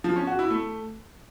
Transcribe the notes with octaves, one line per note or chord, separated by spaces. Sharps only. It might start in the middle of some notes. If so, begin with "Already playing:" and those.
F3
C#4
F#4
E4
A3